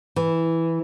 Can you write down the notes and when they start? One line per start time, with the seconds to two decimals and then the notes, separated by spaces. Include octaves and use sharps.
0.16 E3